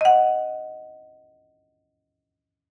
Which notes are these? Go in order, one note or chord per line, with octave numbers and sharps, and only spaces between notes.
D#5 F#5